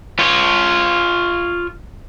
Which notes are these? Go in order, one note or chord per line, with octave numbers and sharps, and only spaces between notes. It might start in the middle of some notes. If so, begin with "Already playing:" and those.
F4 C#5